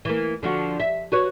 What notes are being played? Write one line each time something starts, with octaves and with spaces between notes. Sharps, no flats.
E3 A#3
D3 F3 F#4
E5
F#4 B4 C#5